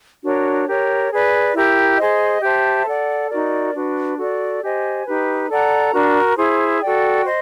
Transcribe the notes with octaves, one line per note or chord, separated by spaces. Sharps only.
D4 F#4 A#4 C#5
G4 A#4 C#5
G#4 B4 D5
E4 G4 A#4
G#4 C5 D#5
G4 C5 E5 A5
A4 D5 F#5
D#4 F#4 A#4 D5
D4 F#4 B4
F#4 A4 D5
G4 C5 D#5 G#5
D#4 G4 B4
A4 D5 F#5 A#5
D4 F#4 A#4
E4 G#4 C5
F#4 A4 D5 G5
C5 D#5